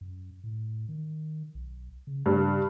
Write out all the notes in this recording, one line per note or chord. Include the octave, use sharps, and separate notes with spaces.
F#2
A2
D#3
B1
C#3
G2 C#3